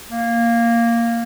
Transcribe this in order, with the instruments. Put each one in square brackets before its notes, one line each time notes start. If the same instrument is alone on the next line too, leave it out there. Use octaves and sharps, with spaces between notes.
[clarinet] A#3